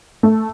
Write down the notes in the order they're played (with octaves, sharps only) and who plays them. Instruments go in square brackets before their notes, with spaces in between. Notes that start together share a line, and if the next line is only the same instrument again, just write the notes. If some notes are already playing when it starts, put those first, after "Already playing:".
[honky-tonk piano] A3